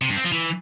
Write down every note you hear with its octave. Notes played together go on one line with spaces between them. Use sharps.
C3
G2
C4
F3
E3